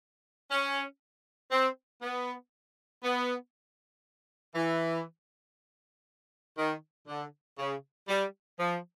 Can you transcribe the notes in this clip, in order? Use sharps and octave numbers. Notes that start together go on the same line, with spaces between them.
C#4
C4
B3
B3
E3
D#3
D3
C#3
G3
F3